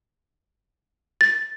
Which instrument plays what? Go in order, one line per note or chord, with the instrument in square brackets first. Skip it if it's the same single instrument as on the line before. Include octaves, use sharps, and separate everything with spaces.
[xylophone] A6